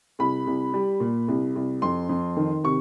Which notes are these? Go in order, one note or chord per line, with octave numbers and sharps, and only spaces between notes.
C2 B5
C2
G3
A#2
C2
C2
F2 C6
F2
D#3
C3 C#6